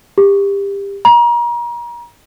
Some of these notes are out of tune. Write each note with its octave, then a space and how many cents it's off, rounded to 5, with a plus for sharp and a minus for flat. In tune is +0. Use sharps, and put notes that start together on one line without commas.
G4 +25
A#5 +35